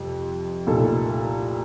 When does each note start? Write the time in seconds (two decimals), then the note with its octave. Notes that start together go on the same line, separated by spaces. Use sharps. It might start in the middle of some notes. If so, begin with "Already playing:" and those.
Already playing: F2 C3 G3
0.67 C2 A#2 A3 D#4 A4